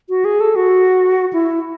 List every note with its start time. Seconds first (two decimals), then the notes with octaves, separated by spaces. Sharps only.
0.09 F#4
0.25 G#4
0.40 A4
0.56 F#4
1.33 E4